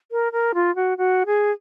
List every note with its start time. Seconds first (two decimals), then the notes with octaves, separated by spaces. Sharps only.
0.12 A#4
0.32 A#4
0.54 F4
0.76 F#4
0.98 F#4
1.26 G#4